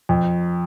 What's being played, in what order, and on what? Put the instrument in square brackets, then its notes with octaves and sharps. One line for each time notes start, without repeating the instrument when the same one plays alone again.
[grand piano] F2